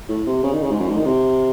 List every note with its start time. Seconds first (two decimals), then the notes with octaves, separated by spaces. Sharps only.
0.09 A2
0.26 C3
0.43 C#3
0.53 D#3
0.61 C#3
0.71 G#2
0.80 F#2
0.89 G#2
0.97 D#3
1.05 C3